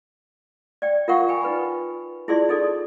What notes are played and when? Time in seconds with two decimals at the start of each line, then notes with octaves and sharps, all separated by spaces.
0.82 D5 G5
1.08 F4 A#4 F5 F#5 C#6
1.29 G5 G#5 B5
1.43 D#4 B4 B5
2.28 E4 F4 G#4 D5 C6
2.49 D#4 G#4 A4 D5